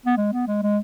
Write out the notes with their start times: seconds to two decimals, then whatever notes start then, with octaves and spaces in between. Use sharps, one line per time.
0.06 B3
0.17 G#3
0.33 B3
0.48 G#3
0.63 G#3